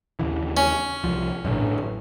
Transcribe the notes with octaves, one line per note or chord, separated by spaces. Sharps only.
D#2 C#3 E3
C#4
C2 F3
A1 F#2 D3